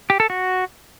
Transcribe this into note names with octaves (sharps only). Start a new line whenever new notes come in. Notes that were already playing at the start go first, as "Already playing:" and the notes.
G4
A4
F#4